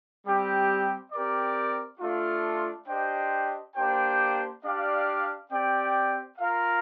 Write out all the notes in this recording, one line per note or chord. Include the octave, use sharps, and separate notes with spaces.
G3 C4 G4
C4 G4 A#4 D5
A3 D4 F4
D4 G4 C5 D#5 G5
A#3 D4 G4 C5 G5
D4 G4 D5 F5
C4 G4 D5 G5
F4 A#4 F5